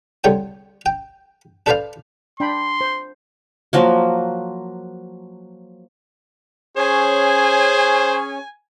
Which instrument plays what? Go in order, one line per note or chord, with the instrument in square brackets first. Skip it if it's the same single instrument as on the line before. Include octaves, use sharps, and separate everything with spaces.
[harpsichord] C2 D3 C#5 G5
G5
D4 A4 B4 C5 D5 F5
[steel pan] D4 G5 B5 [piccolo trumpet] C6
[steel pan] C5
[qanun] F3 F#3 A#3
[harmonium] C#4 C#5 [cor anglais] G#4 [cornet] C5 [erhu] G#5